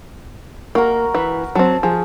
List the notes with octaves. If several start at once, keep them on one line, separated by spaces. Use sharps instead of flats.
A#3 F#4 A#4
E3 B4
F#3 C4 A5
F3 G#4